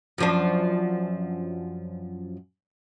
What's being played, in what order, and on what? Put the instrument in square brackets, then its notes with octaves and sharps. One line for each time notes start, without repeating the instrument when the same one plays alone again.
[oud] F#2 F3 D4